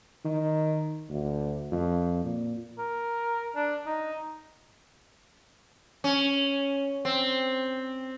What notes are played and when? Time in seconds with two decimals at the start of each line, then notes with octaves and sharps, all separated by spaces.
0.25 D#3
1.09 D2
1.72 F2
2.25 A#2
2.78 A#4
3.55 D4
3.86 D#4
6.04 C#4
7.05 C4